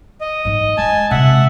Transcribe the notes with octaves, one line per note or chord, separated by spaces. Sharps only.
D#5
G#2 E3
G#3 G#5 A5
C3 G#3 E5 F#5